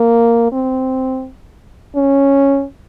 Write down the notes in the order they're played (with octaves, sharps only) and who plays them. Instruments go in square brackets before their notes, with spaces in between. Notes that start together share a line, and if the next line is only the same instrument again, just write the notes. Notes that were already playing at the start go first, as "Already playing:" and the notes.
Already playing: [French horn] A#3
C4
C#4